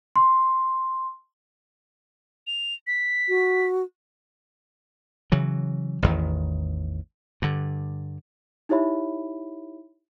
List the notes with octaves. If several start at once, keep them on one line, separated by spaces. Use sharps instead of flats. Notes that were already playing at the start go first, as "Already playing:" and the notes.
C6
F7
B6
F#4
C#3 E3 F#3
A1 E2 D#3
G2 D3
D#4 E4 G4 C#5 E5 B5